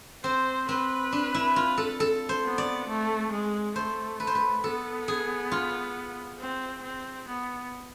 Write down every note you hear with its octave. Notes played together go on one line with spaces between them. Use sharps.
C4 C5
C4 B4
D4
E4
F4
A4
A4
C5
B3
D5
A3
G#3
A3 C5
B4
C5
B4
B3 A4
G#4
F4
C4
C4
B3